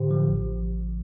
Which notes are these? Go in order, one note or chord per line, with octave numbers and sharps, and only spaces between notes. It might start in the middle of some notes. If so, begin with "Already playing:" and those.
Already playing: A2 D3 G4 C5
F3
A1